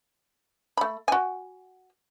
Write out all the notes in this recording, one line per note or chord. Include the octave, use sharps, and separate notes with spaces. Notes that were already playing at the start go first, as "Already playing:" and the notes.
A3 B5
F#4 G#5